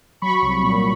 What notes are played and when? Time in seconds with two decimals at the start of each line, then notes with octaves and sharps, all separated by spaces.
0.22 F#3 B5 C#6
0.42 C2
0.63 A#2